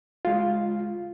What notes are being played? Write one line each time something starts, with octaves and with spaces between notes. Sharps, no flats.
G#3 F4